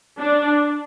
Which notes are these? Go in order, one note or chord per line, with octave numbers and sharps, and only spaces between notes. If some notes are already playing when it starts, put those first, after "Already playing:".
D4